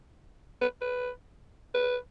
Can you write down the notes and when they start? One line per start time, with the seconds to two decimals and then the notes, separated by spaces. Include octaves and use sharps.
0.61 B4
0.81 B4
1.74 B4